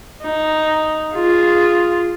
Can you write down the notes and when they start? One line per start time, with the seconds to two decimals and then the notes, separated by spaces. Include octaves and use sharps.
0.23 D#4
1.14 F4 G#4